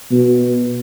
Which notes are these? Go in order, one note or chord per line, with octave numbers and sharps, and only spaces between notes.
B2